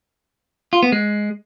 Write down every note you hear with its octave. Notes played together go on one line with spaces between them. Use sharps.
F4
B3
G#3